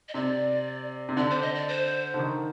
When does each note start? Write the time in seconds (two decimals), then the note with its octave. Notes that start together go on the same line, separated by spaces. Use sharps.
0.09 D#5
0.14 C3 D5
1.09 C3
1.17 D3 D5
1.30 C5
1.42 D#5
1.55 D5
1.68 C5
2.14 D3
2.19 D#3